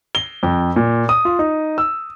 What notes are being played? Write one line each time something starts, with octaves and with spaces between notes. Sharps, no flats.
G7
F2
A#2
D#6
F4
D#4
E6